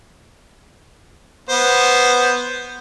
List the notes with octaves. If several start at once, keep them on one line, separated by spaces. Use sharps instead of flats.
B3 C5